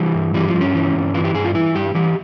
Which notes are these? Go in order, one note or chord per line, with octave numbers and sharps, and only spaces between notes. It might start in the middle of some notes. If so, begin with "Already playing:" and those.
Already playing: E3 G3
G2
E3 G3
F3
G2
C#4
E3
G2
E3 F4
G4
G2 G#4
F4
E3 E4
G2 G4
E3 G4